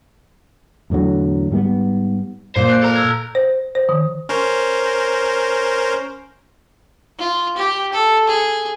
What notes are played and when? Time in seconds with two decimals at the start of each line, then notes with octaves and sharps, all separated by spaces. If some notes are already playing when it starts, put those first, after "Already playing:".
0.90 E2 A2 D3 F#3
1.51 G#2 G3 G#3 B3
2.56 A#2 C5
2.70 F#6 G6 D7
2.82 A4 A#5 F7
2.95 E6 G#6
3.35 C5
3.75 C5
3.89 D#3
4.29 C#4 A#4 C5
7.19 F4
7.57 G4
7.93 A4
8.28 G#4